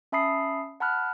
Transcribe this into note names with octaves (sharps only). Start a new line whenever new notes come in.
C#4 E5 A5 B5 D#6 C7
F#5 A5 B5 F6 F#6